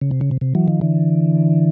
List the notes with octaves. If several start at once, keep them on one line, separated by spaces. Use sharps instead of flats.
C#3
C3
C#3
C3
C3
E3 F#3
D#3 F3
D3 E3